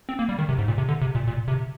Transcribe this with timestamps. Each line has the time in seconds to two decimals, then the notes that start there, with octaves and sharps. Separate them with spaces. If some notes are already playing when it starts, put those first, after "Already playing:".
0.09 C4
0.19 A#3
0.29 G3
0.39 D#3
0.49 C3
0.58 G#2
0.68 A#2
0.78 C3
0.89 D3
1.02 C3
1.15 A#2
1.27 A#2
1.48 C3